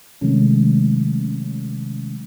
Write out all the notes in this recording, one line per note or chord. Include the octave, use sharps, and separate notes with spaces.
C3 D#3 F#3 G#3 A3 C#4